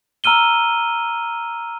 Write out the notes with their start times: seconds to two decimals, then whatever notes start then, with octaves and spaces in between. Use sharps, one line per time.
0.24 A#5 E6 F6 D#7 G7